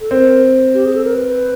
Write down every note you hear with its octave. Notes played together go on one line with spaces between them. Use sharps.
A4
C4 A#4
G4
G#4
A4
A#4
B4